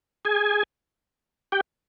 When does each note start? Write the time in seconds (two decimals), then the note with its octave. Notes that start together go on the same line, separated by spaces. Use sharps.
0.25 G#4 G#5
1.52 G4 G5